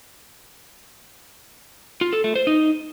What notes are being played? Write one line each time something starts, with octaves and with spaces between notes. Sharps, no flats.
F4
A4
A3
C5
D#4